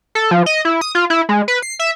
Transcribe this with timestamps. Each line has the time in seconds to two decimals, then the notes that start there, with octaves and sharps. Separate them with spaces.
0.15 A4
0.31 F3
0.46 D#5
0.65 E4
0.81 D#6
0.95 F4
1.10 E4
1.29 G#3
1.48 B4
1.62 C7
1.79 E5